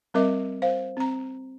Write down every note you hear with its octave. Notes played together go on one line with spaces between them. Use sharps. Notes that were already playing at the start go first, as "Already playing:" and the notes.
G3 C4 A#4 D#5 E5 D6
C5 F5
C4 A#5